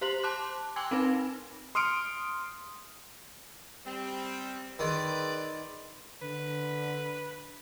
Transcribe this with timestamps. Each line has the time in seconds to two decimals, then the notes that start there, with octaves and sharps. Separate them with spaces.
0.01 G4 C5 C6 F#7
0.23 A5 C6 D6 F#6
0.76 G5 G#5 C6 D6 E6 G#6
0.91 C4 D#4 B4
1.75 C6 D#6 F6 C#7 D7
3.86 G3 C4
4.79 D#3 G#4 B4 D5 C6 E6
6.22 D3 B4